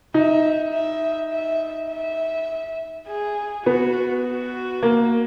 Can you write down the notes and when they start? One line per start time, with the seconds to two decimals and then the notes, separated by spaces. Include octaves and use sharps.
0.14 D#4 E5
0.74 E5
1.33 E5
1.90 E5
3.07 G#4
3.66 B3 F#4
4.25 F#4
4.83 A#3